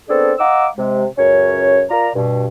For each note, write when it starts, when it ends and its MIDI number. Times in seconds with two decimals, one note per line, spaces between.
0.09 0.33 59
0.09 0.33 60
0.09 0.33 62
0.09 0.33 68
0.09 0.33 69
0.39 0.67 75
0.39 0.67 77
0.39 0.67 78
0.39 0.67 82
0.39 0.67 86
0.39 0.67 88
0.77 1.05 48
0.77 1.05 56
1.18 1.84 37
1.18 1.84 42
1.18 1.84 61
1.18 1.84 73
1.90 2.09 65
1.90 2.09 70
1.90 2.09 74
1.90 2.09 82
2.15 2.47 43
2.15 2.47 47